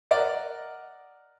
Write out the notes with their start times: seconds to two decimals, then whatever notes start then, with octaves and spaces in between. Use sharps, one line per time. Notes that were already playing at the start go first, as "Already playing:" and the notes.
0.11 A#4 D5 D#5 F#5